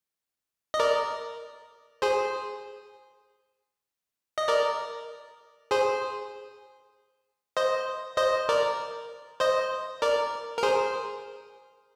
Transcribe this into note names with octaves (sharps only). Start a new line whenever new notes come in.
D#5
A#4 D5
G#4 C5
D#5
A#4 D5
G#4 C5
C5 D#5
C5 D#5
A#4 D5
C5 D#5
A#4 D5
A#4
G#4 C5